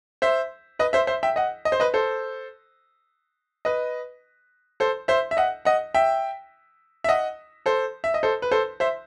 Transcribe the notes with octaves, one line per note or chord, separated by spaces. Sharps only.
C5 E5
B4 D#5
C5 E5
C5 E5
E5 G5
D#5 F#5
D#5
C5
B4 D#5
A4 C5
B4 D#5
A4 C5
C5 E5
E5
D#5 F#5
D#5 F#5
E5 G5
E5
D#5 F#5
A4 C5
E5
D#5
A4 C5
B4
A4 C5
C5 E5